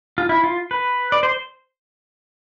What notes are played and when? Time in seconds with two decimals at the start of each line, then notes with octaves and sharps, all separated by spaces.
0.18 F4
0.29 E4
0.44 F4
0.71 B4
1.12 D5
1.23 C5